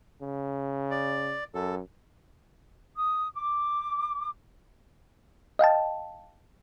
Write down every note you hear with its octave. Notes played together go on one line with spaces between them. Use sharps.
C#3
D5
F#2 A4
D#6
D6
D#5 F5 G5 A5